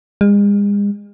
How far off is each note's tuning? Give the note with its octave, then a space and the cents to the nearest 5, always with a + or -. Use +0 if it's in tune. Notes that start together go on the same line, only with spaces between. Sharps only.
G#3 -40